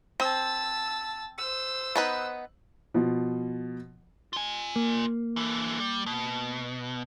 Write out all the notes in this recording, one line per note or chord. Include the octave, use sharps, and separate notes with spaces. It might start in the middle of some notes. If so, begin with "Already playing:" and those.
C4 A5 E6
C5 E6
B3 D#4 B4
B2 F3
F4 G#5
A#3
D3 E3
G3
B2